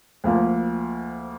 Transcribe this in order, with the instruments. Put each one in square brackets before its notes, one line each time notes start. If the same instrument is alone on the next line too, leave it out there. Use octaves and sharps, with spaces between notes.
[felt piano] D2 F3 A#3